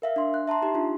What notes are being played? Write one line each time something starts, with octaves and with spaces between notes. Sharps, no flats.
A#4 E5 F5
D4 C6
F#6
E5 A5 A#5 C6
D#4 G4 C6
D4 F4